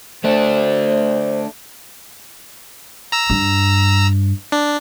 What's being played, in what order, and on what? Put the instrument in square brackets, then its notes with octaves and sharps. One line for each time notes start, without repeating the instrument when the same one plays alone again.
[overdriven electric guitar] A3 D4 [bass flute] C5
[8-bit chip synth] A#5 E6
[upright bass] G2
[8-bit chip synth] D4